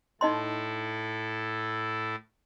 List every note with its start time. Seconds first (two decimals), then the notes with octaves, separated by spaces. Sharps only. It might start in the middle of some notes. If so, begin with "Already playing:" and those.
0.21 A2 D#4 E4 A4 D#5 C6